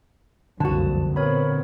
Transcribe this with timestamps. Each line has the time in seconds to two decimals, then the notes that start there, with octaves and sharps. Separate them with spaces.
0.60 F#1 C2 F2 D3 F#4 A5
1.16 A#2 B3 C4 A#4 C#5 B5